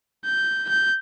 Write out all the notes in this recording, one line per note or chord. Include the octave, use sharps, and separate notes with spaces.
G6
G6